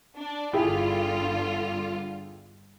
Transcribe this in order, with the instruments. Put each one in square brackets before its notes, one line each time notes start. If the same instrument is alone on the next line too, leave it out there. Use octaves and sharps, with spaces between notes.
[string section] D4
[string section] G1 D3 F4 [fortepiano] E4 G4 G#4